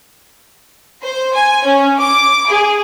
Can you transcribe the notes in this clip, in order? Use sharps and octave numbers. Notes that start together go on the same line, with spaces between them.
C5
G#5
C#4
D6
G#4